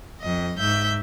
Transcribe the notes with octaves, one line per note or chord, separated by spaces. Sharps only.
F2 D#5
G#2 E5 G6